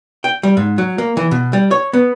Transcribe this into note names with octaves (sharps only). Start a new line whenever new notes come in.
G5
G3
G#2
F#3
A#3
E3
B2
G3
C#5
B3